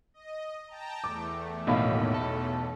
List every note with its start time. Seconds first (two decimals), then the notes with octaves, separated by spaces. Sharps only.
0.14 D#5
0.68 G5 A5 A#5
1.04 E2 A3 D6
1.67 B1 A2 D#3 A#3 D#5 F5 B5
2.14 A4